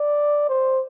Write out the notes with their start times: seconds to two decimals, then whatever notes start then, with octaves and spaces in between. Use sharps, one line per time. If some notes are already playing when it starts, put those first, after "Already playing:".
Already playing: D5
0.49 C5